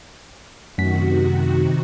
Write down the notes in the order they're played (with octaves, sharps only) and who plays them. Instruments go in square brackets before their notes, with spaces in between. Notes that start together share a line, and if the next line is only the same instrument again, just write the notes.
[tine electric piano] F#2 A3 B6 [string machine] C3 D#3 F#4